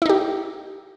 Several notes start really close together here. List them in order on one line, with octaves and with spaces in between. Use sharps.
E4 D#4 G4